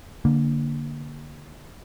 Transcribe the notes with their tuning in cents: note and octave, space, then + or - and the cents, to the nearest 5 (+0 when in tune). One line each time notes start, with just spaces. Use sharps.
D3 +0 A#3 +0